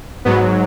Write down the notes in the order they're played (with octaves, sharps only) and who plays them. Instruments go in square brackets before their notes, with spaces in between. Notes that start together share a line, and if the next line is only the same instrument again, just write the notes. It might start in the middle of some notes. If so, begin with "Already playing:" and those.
[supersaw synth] G#2 F#3 B3